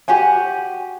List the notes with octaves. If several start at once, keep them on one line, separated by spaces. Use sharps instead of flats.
F#4 G4 F#5 G#5